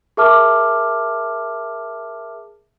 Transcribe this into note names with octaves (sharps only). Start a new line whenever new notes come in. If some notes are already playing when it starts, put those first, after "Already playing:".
G#4 A#4 E5 A5 D6 F6